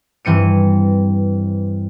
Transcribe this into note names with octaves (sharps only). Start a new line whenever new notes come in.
G2 E3 C4 C#7 D#7